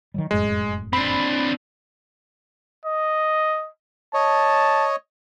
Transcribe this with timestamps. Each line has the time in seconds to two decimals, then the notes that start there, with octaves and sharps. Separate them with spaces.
0.14 D#3 F#3 G3
0.31 F1 F#2 A2 G#3
0.93 C4 D4 B5
2.86 D#5
4.14 C#5 D#5 A5